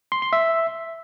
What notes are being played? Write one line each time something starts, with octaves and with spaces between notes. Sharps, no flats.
C6
C6
E5